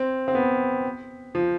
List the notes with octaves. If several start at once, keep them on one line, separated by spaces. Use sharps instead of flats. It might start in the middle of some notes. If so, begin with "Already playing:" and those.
Already playing: C4
C4
B3
F3